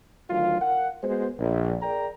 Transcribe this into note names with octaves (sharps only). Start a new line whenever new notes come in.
D2 D#3 F#3 F4 F5
A#4 F5 F#5
G#3 B3 F#4 C5
A#1
G#4 A#4 D5 G5 A#5